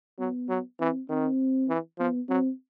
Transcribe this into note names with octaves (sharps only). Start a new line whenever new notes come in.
F#3 B3
F#3
E3 C4
D#3 C4
E3
F3 B3
F#3 C4